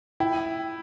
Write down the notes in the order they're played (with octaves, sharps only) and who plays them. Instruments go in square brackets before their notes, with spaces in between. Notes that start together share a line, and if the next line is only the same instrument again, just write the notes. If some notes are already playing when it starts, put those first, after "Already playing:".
[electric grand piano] E4 [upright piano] G5